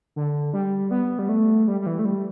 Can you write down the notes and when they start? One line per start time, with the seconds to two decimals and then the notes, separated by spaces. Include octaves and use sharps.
0.16 D3
0.54 G3
0.91 B3
1.19 G3
1.29 A3
1.67 G3
1.81 G3
1.86 E3
1.99 A3
2.05 G3